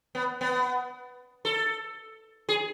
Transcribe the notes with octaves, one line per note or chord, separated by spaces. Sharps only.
B3
B3
A4
G#4